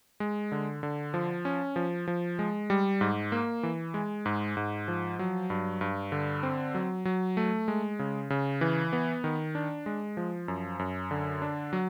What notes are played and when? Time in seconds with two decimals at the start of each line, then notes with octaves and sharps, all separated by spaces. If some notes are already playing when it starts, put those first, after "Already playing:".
0.20 G#3
0.52 D3
0.83 D3
1.14 F3
1.45 C#4
1.76 F3
2.08 F3
2.39 G#3
2.70 G3
3.01 G#2
3.32 A#3
3.63 E3
3.94 G#3
4.26 G#2
4.57 G#2
4.88 F3
5.19 F#3
5.50 G2
5.81 G2
6.12 D3
6.43 C4
6.75 F#3
7.05 F#3
7.37 A3
7.68 G#3
7.99 C#3
8.30 C#3
8.61 E3
8.93 B3
9.24 D#3
9.55 D4
9.86 G#3
10.17 F3
10.48 F#2
10.79 F#2
11.11 D3
11.42 D4
11.73 F#3